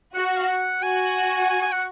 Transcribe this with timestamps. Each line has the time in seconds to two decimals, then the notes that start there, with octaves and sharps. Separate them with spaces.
0.14 F#4 F#5
0.25 F#5
0.36 F5
0.48 F#5
0.82 F#4 G#5
1.50 G#5
1.62 G#5
1.72 F#5